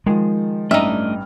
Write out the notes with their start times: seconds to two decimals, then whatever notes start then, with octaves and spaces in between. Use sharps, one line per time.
0.06 D#3 F3 G#3
0.71 A1 G2 A3 D4 D#4 D#5 E5 F6